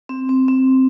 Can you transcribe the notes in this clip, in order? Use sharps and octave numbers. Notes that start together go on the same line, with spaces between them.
C4
C4
C4